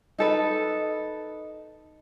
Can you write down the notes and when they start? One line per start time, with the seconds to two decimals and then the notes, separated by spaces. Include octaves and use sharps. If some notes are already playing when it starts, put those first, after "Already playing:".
0.18 D#4 A4 B4